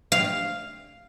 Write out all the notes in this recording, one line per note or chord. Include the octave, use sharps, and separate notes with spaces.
F5